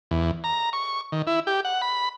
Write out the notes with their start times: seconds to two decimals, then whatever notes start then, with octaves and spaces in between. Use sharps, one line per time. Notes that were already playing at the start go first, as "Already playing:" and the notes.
0.11 E2
0.44 A#5
0.73 C#6
1.12 D#3
1.27 E4
1.47 G4
1.65 F#5
1.82 B5